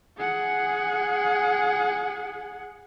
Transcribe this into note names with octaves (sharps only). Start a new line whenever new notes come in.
G#4 F#5